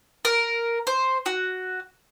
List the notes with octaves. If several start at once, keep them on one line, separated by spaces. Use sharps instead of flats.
A#4
C5
F#4